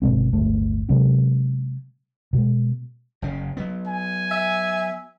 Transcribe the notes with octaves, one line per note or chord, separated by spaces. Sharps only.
G1 B2 G#3 C4
D1 G1 A2 A3
C3 F#3 G#3 C#4
B2 G#3
F#1 C#3
F#3 B3
G#5
E5